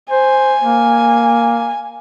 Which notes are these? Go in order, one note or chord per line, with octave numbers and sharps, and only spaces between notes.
C5 G#5
A#3